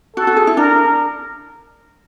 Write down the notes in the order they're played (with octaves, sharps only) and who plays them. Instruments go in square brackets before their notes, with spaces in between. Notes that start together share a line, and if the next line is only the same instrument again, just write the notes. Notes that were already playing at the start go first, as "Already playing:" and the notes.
[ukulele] F#4 [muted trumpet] A4
[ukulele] F#4
G#4
E4
[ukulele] D4 [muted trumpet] A#4